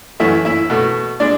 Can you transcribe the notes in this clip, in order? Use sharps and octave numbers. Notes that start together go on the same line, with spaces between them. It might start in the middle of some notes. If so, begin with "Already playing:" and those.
F#2 E3 A3 E4 E5
E4 E5
B2 A3
G#3 D4 D5